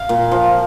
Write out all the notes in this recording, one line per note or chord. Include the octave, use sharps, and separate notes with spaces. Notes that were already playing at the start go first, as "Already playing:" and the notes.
Already playing: F5
A#2
F3